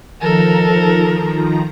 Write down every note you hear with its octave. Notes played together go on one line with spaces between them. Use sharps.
D#3 F3 A4 A#4 A#5